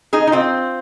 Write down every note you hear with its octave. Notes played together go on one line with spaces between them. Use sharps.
D#4 G#4
D#4
C4 F4